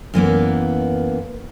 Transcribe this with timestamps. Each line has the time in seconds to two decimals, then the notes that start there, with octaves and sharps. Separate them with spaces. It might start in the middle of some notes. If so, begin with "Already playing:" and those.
0.14 F#2 E3 A#3 B3